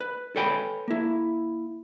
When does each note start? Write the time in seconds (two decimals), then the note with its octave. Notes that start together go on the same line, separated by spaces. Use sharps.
0.01 B4
0.36 A4 B4 C#5 G5 G#5 B5
0.88 A#3 E4